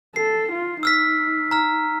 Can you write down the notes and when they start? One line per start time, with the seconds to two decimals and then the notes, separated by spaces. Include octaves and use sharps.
0.16 A4 C7
0.52 F4
0.83 D#4 E6 F6 B6
1.51 A#5 F6